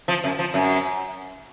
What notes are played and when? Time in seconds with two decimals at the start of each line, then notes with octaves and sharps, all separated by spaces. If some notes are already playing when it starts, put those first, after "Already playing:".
0.08 F3
0.24 F#2
0.39 F3
0.54 F#2